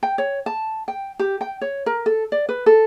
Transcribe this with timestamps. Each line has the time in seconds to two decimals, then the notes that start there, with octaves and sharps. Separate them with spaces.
0.03 G5
0.18 C#5
0.46 A5
0.88 G5
1.19 G4
1.41 G5
1.61 C#5
1.86 A#4
2.06 A4
2.32 D5
2.49 B4
2.66 A4